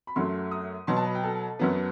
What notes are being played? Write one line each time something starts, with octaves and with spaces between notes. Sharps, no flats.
B5
F#2 F#3 A3 C6
D#6
B2 F#3 B3 C6
A5
B4
G5
A4
F#2 F#3 B3